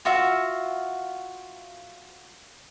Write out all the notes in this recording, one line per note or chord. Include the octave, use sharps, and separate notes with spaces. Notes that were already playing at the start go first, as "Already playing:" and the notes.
F4 F#4 E5 F5